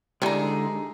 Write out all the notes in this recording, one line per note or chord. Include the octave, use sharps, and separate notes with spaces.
D3 E3 G3 G#3 D4 D#4 G#4